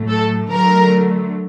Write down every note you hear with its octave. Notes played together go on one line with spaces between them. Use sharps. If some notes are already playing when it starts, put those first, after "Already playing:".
Already playing: A2 F#3 A3
A4
D3 F#3 A3 A#4